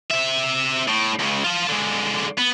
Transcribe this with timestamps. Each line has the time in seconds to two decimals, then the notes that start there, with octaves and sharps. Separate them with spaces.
0.11 C4 E5
0.88 A2
1.19 C#2 C#3
1.44 F4 A5
1.68 D3 G#3
2.38 B3